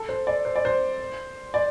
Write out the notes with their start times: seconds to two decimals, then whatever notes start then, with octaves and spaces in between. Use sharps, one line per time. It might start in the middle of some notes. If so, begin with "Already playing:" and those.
Already playing: A4
0.09 C5
0.27 D5
0.45 C5
0.56 D5
0.65 C5
1.54 D5